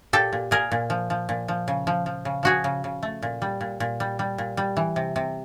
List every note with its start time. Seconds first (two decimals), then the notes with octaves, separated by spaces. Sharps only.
0.13 A#2 G4 A4
0.33 A#2
0.51 A#2 G#4 A#4
0.72 A#2
0.90 F3
1.10 F3
1.29 A#2
1.48 F3
1.68 C#3
1.87 F3
2.06 F3
2.25 C#3
2.43 F3 F#4 G#4
2.64 C#3
2.84 C#3
3.03 A3
3.23 A#2
3.42 G3
3.61 A#2
3.80 A#2
4.00 G3
4.19 G3
4.38 A#2
4.57 G3
4.77 E3
4.96 C3
5.16 C3